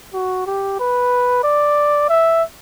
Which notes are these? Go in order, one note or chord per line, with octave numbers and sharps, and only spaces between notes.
F#4
G4
B4
D5
E5